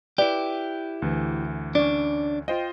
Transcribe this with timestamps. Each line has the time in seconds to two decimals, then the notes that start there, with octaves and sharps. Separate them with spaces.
0.18 E4 G4 B4 D5
1.02 D2 E3
1.75 C#4 D4 D5
2.48 F4 C5 D#5 G5